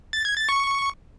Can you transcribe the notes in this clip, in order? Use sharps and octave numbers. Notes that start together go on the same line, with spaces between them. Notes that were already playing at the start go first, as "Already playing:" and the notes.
A6
G#6
A6
C#6